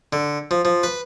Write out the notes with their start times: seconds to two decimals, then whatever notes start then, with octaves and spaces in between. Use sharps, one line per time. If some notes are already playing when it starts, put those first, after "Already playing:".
0.13 D3
0.51 F3
0.65 F3
0.83 B4